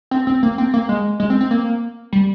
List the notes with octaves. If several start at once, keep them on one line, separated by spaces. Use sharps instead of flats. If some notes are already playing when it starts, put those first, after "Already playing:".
C4
C4
A#3
C4
A#3
G#3
G#3
C4
C4
A#3
G3